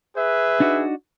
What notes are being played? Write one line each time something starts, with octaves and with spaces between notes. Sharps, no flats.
G#4 B4 E5
D4 D#4 F#4